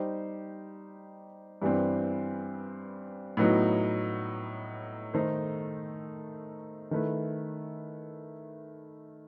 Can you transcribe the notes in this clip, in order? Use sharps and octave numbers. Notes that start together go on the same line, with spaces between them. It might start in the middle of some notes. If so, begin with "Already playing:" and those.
Already playing: G3 D#4 G4 C5
G2 E3 G3 C4
A2 F#3 B3 D#4
D#3 A3 D#4 A4 C5
D#3 A3 E4 B4